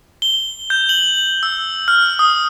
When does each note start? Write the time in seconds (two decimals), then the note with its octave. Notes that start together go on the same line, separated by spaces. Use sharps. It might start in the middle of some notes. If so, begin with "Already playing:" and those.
0.22 G7
0.70 G6
0.89 F#7
1.43 E6
1.88 F6
2.19 D#6